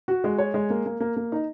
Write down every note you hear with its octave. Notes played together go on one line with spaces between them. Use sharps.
F#4
G#3
C#5
G#3
A#3
A#3
A#3
A#3
D#4